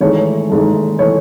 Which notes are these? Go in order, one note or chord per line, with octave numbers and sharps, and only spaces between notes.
G#1 G#2 E3 A3 C#5
G#1 G#2 E3 A3
E3 A3 C#5